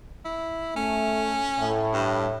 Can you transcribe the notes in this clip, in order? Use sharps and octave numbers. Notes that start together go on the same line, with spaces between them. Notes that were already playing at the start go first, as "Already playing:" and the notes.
E4
A3 C#4
A2
G2